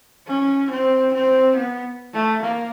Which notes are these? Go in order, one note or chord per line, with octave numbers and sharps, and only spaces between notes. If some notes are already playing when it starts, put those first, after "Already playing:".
C#4
C4
C4
B3
A3
A#3